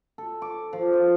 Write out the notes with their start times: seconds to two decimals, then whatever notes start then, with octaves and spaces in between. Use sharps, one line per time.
0.18 A4
0.42 D6
0.73 F3
0.93 F4